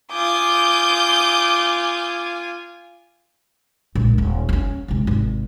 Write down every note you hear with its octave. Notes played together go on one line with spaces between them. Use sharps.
F4 G#5 D6 D#6 G6
A#1 G#2
D#1
C4 C#4
G#2 C3
G#1 C3